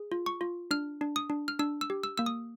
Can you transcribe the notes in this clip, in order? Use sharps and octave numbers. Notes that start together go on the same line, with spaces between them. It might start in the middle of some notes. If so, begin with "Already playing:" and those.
Already playing: G#4
F4
C#6
F4
D4 F6
D4
D#6
D4
F6
D4 E6
E6
G4
E6
A#3 E6
D#6